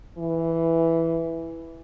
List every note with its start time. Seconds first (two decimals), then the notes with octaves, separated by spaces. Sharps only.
0.18 E3